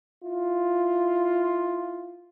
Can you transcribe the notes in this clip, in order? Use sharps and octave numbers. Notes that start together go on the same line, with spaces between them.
E4 F4